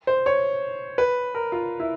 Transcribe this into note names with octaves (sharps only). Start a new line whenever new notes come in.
C5
C#5
B4
A#4
F4
E4